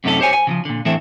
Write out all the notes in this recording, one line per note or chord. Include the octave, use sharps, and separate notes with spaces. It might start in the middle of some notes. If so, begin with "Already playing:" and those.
F#2 C3 A3 C#4 D#4 A4
G4 C5 C#5 G#5
G#5
C#3 E3 F3
A#2 D3
A2 D3 E3 C4 A4 E5